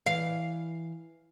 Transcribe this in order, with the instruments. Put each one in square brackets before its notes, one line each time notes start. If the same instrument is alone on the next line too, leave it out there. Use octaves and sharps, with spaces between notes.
[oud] E3 F5